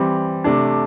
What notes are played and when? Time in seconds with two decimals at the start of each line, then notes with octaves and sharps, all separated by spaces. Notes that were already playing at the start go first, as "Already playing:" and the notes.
Already playing: E3 G3 C4
0.44 C3 A3 D4